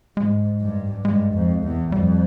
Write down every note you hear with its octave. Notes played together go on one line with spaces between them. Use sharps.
G#2 G#3
G2
G2 G#3
F2
E2
F2 G3